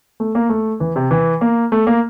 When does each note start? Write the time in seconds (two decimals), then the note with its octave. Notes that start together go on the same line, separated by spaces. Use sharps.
0.20 A3
0.35 A#3
0.49 A3
0.80 E3
0.96 C3
1.11 E3
1.41 A#3
1.72 A3
1.87 A#3